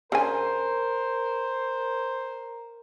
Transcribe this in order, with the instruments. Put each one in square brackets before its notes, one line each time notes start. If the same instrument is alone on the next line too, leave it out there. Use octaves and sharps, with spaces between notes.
[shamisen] C#3 D4 G#5 [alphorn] A#4 [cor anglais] C5